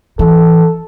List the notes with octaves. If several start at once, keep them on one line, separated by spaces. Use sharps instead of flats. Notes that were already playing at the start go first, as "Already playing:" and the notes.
E3 A4